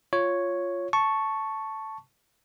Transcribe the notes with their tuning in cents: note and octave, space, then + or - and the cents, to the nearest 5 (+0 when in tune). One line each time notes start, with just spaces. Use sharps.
F4 +0 C#5 +0
A5 +0 C#6 +0